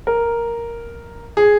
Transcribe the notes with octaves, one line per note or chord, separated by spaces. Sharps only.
A#4
G#4